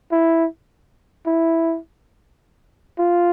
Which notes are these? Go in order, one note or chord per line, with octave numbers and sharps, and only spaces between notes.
E4
E4
F4